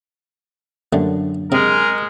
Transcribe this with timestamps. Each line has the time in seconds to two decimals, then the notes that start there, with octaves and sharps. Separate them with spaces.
0.93 F#2 D3 G3 A3 A#3
1.52 C3 G#3 C4 G#4 A#4